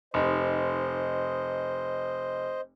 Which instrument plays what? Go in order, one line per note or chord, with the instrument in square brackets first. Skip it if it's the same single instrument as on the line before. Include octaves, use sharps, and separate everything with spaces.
[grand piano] F1 D#4 [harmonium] C5 D#5